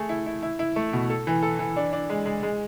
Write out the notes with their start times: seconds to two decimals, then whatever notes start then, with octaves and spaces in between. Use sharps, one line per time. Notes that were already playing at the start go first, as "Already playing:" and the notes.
Already playing: A3 G#4
0.09 E4
0.26 E4
0.43 E4
0.59 E4
0.76 A3
0.93 B2
1.10 A4
1.27 E3
1.43 A4
1.59 E3
1.77 D4
1.93 D4
2.10 G#3
2.26 G#3
2.43 G#3